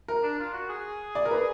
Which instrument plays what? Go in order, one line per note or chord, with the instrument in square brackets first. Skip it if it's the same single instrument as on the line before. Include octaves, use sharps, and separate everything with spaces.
[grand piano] A#4
[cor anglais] D4
F4
F#4
G#4
[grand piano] D5
A#4
B4